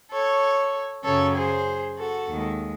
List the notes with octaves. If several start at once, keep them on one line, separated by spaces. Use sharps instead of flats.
A4 C#5
F#2 C#3 F#3 A4 C#5
G#4 C5
F#4 A4
D#2 D#3 G#3